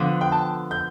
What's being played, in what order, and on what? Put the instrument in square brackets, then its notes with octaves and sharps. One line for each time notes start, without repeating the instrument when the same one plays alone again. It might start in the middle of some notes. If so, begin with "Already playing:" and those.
Already playing: [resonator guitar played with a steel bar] D3 F3 B3
[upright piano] G5
A5
G6